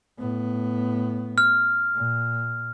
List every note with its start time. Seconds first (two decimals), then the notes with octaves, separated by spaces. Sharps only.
0.18 A2 B3
1.38 F6
1.95 A#2